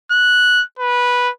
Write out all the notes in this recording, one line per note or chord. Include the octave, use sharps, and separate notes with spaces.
F#6
B4